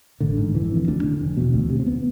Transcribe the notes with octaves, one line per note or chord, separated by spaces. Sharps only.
A1 D3
G#2
F1 E3
F2 D3
D2 D4
D3
F1
E2 B2
D2
C3
C4
B3